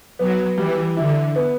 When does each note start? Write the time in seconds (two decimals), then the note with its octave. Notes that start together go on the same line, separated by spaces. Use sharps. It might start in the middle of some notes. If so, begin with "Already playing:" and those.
0.19 F#3 B3
0.58 E3 G3
0.97 D3 E4
1.36 B3